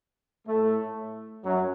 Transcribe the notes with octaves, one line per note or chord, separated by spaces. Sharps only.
A2 A3
F#2 F#3